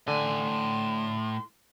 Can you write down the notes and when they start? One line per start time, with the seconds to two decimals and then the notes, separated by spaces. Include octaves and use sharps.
0.08 A2 D3 G#5 C6